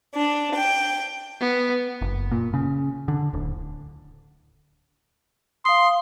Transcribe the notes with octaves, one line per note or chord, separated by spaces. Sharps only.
D4
G5
B3
F#1
A#2
C#3
D3
D1
F5 C6 D#6